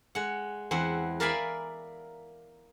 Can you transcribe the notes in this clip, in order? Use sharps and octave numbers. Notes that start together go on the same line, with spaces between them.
G#3 F#5
E2 C4 E4 F#5
A#4 D5 E5 F5 G#5 B5